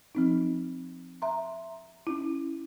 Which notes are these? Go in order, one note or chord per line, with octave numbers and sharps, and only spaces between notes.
F3 C4 D#4
E5 A#5 C6
C#4 E4